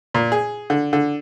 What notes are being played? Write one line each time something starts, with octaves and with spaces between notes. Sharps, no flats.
A#2
G#4
D3
D3